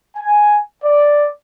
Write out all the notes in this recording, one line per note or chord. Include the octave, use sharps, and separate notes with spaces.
G#5
D5